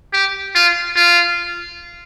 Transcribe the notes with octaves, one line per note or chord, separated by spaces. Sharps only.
G4
F4
F4